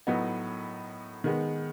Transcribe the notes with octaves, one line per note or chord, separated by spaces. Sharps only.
A2 F#3 B3 D#4
D#3 G#3 B3